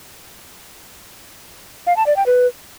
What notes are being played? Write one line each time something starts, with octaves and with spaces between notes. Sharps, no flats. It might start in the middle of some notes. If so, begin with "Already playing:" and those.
F5
A5
D5
G5
B4